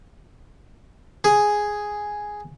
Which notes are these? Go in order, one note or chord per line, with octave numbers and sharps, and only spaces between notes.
G#4